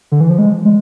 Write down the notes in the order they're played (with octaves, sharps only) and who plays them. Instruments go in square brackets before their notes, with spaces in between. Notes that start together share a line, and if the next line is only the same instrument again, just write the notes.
[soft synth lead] D3
E3
F3
G#3
G#3